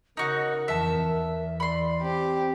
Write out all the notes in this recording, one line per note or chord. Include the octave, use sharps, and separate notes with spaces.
C#3 D#4 F#4 A#4
F2 E3 E5 A5
E2
D5 B5 C6
C4 G4